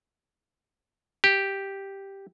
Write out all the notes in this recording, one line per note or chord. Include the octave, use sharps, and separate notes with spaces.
G4